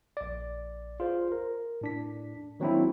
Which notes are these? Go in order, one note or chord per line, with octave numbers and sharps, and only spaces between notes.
A#1 D5
F4 G#4 C5
A#4
A2 D4 B6
D#3 F#3 A#3 C4 D4 E4